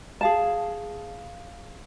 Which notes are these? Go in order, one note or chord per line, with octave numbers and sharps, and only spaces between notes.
G#4 F5 A5